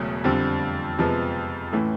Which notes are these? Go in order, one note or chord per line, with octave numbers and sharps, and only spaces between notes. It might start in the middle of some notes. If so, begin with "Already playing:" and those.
Already playing: E1 E2 C#3 F#3 A3
F2 D3 G3 C4
F2 C3 F3 G#3 B3
A2 E3 A3 C#4